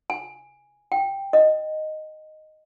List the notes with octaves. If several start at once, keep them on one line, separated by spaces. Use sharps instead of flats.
G#5
G5
D#5